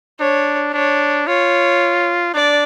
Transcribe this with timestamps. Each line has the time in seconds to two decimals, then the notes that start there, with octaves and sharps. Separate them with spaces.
0.20 D4 C#5
0.74 D4 C#5
1.27 F4 C#5
2.34 D4 D5